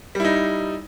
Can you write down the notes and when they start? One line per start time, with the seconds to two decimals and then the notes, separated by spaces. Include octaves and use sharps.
0.15 G3
0.20 E4
0.25 D#4